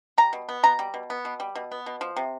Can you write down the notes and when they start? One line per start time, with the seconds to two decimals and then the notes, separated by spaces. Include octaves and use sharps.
0.18 G3 A#5
0.33 B2
0.49 B3
0.63 B2 A#5
0.79 G3
0.94 B2
1.10 B3
1.25 B2
1.40 G3
1.55 B2
1.71 B3
1.86 B2
2.01 F3
2.17 C3